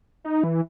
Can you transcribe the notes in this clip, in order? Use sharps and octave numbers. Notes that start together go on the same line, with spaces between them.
D#4
E3